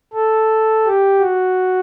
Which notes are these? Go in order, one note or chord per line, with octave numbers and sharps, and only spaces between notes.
A4
G4
F#4